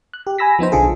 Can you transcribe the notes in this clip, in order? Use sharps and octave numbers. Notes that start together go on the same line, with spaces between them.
F#6
G4
G#5 B5 E6 A#6 B6
F3 B3 D#4 C5
B1 D3 F4 G#4 A4